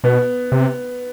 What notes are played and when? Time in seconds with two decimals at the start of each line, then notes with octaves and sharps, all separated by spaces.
0.04 B2 B3
0.52 C3